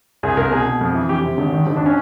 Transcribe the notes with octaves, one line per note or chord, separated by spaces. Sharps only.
C2 G#4
C2 A#4
B2 G#4
B2
F2
E3
F2 G4
C3
G#1
D#3
G#1
D4
C#4